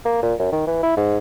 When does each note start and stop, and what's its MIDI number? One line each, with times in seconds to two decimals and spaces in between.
0.05 0.20 58
0.22 0.34 46
0.39 0.50 42
0.52 0.65 51
0.67 0.78 52
0.83 0.96 64
0.97 1.18 44